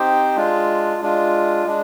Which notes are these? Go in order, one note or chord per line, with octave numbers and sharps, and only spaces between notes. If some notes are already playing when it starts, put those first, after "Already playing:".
Already playing: C4 D#4 G4 C5 G5
G#3 D4 F4
G#3 D4 F4
G#3 D4